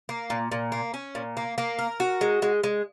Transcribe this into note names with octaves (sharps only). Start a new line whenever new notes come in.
A#3
A#2
A#2
A#3
C#4
A#2
A#3
A#3
A#4
F#4
G#3
G#3
G#3